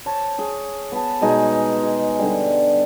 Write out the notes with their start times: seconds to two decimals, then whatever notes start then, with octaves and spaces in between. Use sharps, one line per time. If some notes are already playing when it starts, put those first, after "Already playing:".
0.06 C5 C#5 A5
0.38 G#4 C#5
0.92 B3 A5
1.21 B2 G#3 D#4 G#5
1.84 G#4
2.19 D3 G3